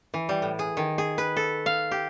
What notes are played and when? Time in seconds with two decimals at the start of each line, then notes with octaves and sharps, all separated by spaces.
0.14 E3
0.29 G3
0.42 A2
0.59 G#4
0.77 D#3
0.98 G#4
1.18 B4
1.37 A4
1.66 F5
1.91 G4